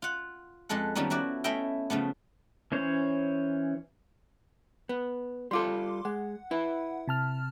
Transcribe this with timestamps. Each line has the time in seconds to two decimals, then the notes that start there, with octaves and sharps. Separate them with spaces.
0.02 F4 F#5
0.69 F2 G#3 A4 B4 F#5
0.95 D#3 F3 G3 B3 C#4 D#4
1.10 F3 E4 F#4 D5
1.44 A3 C#4 E4 D#5 E5 G5
1.90 C#3 F3 A3 B3
2.72 E3 C#4 C5 C#5
4.89 B3
5.51 G3 F4 A4 C6 D6
6.05 G#3 F#5
6.51 E4 B4
7.08 C3 A5 F6